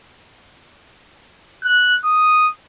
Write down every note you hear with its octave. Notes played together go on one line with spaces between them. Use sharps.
F#6
D#6